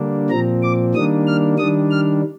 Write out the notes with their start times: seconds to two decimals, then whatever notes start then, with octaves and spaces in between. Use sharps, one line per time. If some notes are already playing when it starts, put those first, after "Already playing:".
Already playing: D3 G3 A#3 D4
0.30 A#2 F3 C4 A#5
0.63 D6
0.94 D#3 G3 A#3 D4 D#6
1.27 F6
1.58 D#3 G3 D4 D#6
1.90 F6